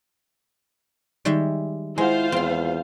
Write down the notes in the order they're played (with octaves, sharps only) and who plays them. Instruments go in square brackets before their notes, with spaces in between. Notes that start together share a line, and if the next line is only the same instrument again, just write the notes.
[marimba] D#3 D#4 [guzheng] G3 G#3 E5
[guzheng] G#3 [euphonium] E4 [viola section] F4 C5 F5 [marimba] F#5 G#5
[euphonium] E2 [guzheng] C4 C6